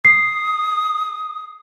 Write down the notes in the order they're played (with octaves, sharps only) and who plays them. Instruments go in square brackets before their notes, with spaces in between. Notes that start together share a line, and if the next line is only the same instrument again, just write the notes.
[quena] D#6 [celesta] C7